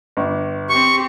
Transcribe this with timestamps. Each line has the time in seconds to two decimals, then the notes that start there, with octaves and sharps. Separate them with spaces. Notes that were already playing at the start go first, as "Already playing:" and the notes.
0.17 G1
0.69 C4 G4 C#6